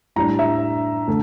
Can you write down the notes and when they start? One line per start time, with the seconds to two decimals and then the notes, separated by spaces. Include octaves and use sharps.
0.16 A2 G3 D4 A#5
0.39 E5
1.08 D3 A3